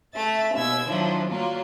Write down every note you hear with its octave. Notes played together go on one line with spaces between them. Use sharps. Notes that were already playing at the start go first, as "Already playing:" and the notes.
A3 E5 A6
D#2 B2 E6 G#6
D#3 F3 F#3 D4 E4
F#3 G3 A#3 F4